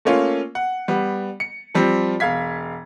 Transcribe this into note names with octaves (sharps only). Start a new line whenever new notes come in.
A3 A#3 C#4 F4
F#5
G3 B3
C#7
F3 G3 C4
E1 F5 G#6 B6